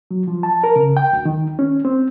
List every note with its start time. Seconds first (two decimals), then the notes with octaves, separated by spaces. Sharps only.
0.11 F#3
0.28 F3
0.43 A5
0.64 A#4
0.76 C#3
0.97 G5
1.13 D2
1.25 D#3
1.59 C#4
1.85 C4